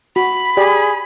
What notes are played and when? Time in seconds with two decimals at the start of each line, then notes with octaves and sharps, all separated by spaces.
0.16 F#4 B5
0.57 G4 G#4 D5